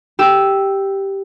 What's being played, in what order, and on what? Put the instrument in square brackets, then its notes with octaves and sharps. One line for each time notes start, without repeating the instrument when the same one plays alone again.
[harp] G4 E6